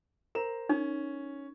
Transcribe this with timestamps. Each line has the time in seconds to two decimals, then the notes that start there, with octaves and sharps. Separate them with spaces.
0.35 A#4 C5 A#5 E7
0.69 C#4 D#4